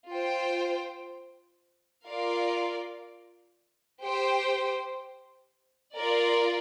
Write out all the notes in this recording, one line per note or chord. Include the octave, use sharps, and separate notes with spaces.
F4 C5 G5
F4 A#4 D5 F5
G4 C5 G5
F4 A#4 D5